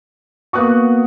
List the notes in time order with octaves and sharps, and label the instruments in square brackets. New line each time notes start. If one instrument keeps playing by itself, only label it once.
[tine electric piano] A#3 B3 F#4 [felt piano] C#6 D#6 F#6